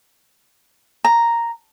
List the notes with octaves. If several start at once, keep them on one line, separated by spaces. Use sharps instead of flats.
A#5